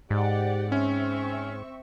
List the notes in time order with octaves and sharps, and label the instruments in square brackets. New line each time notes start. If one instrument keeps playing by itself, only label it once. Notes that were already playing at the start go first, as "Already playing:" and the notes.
[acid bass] G#2 [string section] G4 D5 F#5
[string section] C4 E5 C#6 [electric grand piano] C#4